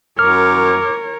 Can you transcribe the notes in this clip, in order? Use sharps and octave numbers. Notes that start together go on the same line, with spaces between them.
F#2 A#4 C#5 D6 F6